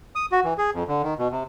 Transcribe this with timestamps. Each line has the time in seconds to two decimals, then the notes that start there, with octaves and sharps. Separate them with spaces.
0.15 D#6
0.32 F#4
0.44 E3
0.58 G#4
0.74 F2
0.88 D3
1.03 D#3
1.19 B2
1.32 C3